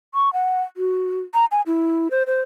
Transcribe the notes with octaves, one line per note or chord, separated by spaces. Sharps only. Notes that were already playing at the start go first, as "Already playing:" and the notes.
C#6
F#5
F#4
A#5
G#5
E4
C5
C5